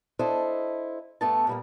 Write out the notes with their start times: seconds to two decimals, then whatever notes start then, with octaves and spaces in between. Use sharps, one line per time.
0.19 D4 E4 A4 C5 D#5
1.21 G2 A3 B3 A4 A5
1.47 A#2 G3 A#3